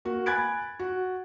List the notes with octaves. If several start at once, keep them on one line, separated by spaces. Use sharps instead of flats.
A#3 F#4
G#5 B5 F#6 G#6 A6 D7
F#4